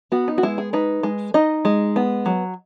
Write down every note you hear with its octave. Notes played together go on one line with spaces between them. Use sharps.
B3 F#4
D#4
F#4
G#3 E4
G#4
D#4 B4
G#3
D#4 D#5
G#3
B3
F#3